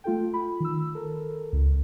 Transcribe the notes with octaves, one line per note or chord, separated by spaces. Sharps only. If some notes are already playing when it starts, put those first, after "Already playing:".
A3 F4 A4 G5
F4 B5
D#3 E6
A4 A#4
C#2